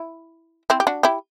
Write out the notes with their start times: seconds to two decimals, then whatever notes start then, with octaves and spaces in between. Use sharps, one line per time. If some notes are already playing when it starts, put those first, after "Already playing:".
Already playing: E4
0.70 C4 E4
0.80 G4
0.87 D4 F#4
1.03 E4 G4